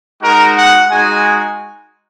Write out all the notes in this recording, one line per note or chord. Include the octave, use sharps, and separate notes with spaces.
G#3 D#4 F#4 A#4
F#5
G#3 D#4 F#4 G#5